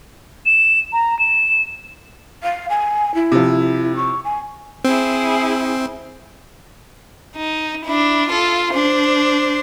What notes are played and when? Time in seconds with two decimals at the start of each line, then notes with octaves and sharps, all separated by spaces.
0.46 E7
0.93 A#5
1.19 E7
2.43 F5
2.70 G#5
3.15 E4
3.32 C3 F3
3.96 C#6
4.25 G#5
4.85 C4 E4 G#4
7.36 D#4
7.85 D4 E4
8.29 F4 A4
8.73 D4 C5